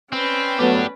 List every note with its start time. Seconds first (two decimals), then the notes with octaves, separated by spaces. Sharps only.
0.13 C4 C#4 B4 D5
0.59 F#3 A3 B3 D4 G4